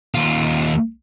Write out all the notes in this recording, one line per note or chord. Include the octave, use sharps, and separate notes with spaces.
D#2 F4